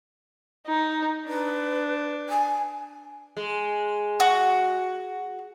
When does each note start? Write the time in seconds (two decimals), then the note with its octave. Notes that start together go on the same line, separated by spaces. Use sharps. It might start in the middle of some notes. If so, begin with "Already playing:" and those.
0.67 D#4
1.28 D4 B4
2.29 G#5
3.37 G#3
4.20 F#4